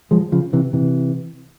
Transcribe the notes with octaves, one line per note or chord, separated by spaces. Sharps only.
F3 G#3
C#3 F3
C3 E3
C3 E3